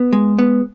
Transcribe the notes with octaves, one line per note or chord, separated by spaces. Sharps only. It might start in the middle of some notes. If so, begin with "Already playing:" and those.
Already playing: B3
G#3
B3